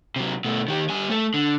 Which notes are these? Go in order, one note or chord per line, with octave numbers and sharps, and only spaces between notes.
C3 F#3
B2 A3
D#3 G4
G3 G#5
A3 A4
D3